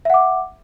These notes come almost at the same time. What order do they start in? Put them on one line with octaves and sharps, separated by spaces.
E5 F#5 D6